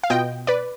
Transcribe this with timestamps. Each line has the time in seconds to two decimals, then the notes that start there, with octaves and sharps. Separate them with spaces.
0.03 F5
0.10 B2 B3 F4 D#5 G5
0.47 B4 D5